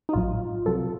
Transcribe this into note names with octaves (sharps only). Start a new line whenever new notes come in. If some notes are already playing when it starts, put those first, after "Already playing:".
D#4
A1 A2 F#3 F4
C2 C3 F#3 A4